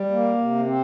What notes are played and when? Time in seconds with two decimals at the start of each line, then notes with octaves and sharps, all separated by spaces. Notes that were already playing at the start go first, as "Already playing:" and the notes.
Already playing: G3
0.11 A#3
0.38 C3
0.66 C4